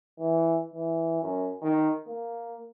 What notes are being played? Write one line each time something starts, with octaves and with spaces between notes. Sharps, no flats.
E3
E3
F#2
D#3
A#3